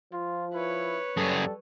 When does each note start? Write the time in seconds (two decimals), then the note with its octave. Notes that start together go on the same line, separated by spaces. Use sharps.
0.13 F3 F4
0.54 E4 B4 C#5
1.17 F#2 G3 G#4 A4